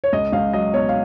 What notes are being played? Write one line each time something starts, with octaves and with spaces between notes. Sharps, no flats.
C#5
C#2 D#5
C#2 F5
F#3 D#5
B2 C#5
F5